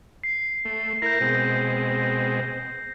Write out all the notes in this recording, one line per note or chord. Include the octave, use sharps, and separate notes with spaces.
C7
A3
E4 A#4 G6 A#6
B2 G#3 C4